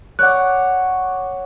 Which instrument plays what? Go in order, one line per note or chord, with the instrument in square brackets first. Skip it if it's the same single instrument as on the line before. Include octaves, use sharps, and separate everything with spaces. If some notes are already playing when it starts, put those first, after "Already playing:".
[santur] C#5 D5 F#5 [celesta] F#6